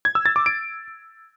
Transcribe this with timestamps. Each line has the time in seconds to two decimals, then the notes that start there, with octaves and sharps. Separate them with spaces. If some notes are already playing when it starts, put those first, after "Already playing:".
0.05 G#6
0.15 E6
0.26 A6
0.36 D6
0.46 D7